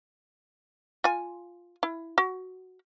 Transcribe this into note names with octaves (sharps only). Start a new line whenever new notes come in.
F4 G#5
E4
F#4